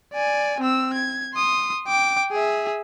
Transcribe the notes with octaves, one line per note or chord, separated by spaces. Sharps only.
D5 G#5
C4 E6
G#6
C6 D#6
G5 D6
G#4 E5